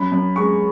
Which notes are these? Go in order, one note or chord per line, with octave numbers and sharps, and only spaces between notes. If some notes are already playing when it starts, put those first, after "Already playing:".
Already playing: F#2 B5
F#2
G#3 C#6